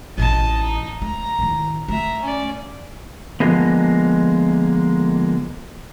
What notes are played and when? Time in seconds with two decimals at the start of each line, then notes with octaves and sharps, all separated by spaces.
0.18 A1 A2 D#5 A5
0.61 D#4
1.02 A3 A#5
1.39 A2 D#3
1.88 A3 E5 A#5
2.21 C#4 D5
3.40 D3 F3 G#3 A#3 B3